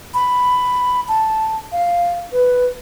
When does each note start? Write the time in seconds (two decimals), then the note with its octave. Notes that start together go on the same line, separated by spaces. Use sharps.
0.14 B5
1.08 A5
1.72 F5
2.32 B4